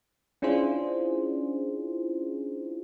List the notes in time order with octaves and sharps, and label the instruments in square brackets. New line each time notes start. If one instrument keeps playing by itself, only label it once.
[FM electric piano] C#4 D4 E4 F4 G#4 C5